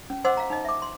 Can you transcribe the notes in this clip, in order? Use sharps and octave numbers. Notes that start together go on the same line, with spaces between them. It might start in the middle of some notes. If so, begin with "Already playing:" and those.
C#4
C5 D#5 F#5 C6 D6 E6
F5 A#5
D#4 D#5
E5 D6
C6